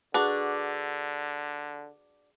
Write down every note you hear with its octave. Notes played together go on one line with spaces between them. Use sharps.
D3 D4 F#4 G#4 B4 D6